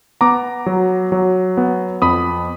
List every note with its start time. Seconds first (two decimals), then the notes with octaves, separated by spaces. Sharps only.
0.21 B3 A#5 D6
0.66 F#3
1.12 F#3
1.57 B3
2.02 F2 B5 D#6